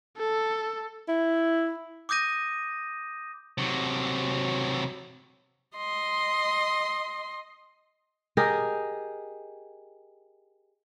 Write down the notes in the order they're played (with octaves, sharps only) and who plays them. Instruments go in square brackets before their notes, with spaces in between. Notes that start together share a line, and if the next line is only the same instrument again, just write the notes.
[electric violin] A4
[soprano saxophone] E4
[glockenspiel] D6 D#6 G6 A#6 D#7
[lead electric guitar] C3 F#3
[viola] D#5 C6
[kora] G4 G#4 A#4 D#5